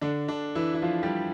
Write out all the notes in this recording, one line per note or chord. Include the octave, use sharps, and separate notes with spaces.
D3 D4
D3 D4
E3 E4
E4
F3 F4
G3 G4